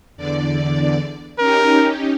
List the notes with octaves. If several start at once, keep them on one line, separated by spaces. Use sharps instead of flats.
E2 D3 D5
C#4 D#4 G4 A#4